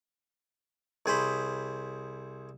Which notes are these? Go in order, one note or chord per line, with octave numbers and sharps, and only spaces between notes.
C2 G#4 C5 B5